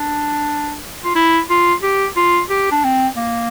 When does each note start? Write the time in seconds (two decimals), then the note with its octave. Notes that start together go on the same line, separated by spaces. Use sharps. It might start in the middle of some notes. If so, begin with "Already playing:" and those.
Already playing: D4
1.04 F4
1.16 E4
1.50 F4
1.83 G4
2.16 F4
2.50 G4
2.71 D4
2.84 C4
3.16 A#3